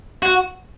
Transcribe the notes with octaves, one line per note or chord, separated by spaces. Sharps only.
F#4